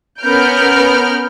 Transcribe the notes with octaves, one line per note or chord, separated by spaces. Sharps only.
B3 C#4 A#4 F6 G6 D7